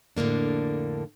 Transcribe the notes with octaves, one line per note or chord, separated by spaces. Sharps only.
F2 A2 D3 A#3 D4